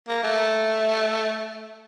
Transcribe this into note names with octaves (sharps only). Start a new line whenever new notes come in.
A#3
A3